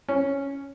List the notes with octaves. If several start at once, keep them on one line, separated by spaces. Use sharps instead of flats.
C#4